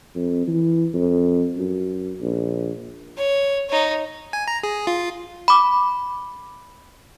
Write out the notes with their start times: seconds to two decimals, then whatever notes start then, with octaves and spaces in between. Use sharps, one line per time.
0.16 F2
0.48 E3
0.94 F2
1.57 F#2
2.21 A#1
3.17 C#5
3.69 D#4 C#5
4.33 G#5
4.47 A#5
4.64 G#4
4.87 F4
5.48 B5 D6